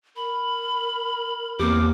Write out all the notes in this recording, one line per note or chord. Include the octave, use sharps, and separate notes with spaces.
A#4 B5
E2 A#3 C4 G4 D6